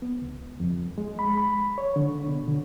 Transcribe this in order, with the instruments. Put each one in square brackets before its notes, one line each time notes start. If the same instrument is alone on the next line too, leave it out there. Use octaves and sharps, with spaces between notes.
[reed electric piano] B3
C#2
F2
G#3
B5
B5
C#5
D3
B2
D3